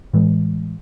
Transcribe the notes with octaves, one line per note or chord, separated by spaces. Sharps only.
A2 E3 G#3